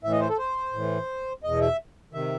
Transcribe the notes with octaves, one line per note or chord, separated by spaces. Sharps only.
A2 E3 E5
D#5
C5
A4
C5
A2 E3
E2 B2 D#5
E5
C3 D#3 E5